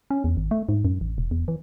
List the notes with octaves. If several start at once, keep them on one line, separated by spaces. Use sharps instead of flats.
C#4
E2
G#1
A3
G#2
F#2
A1
E1
E2
E3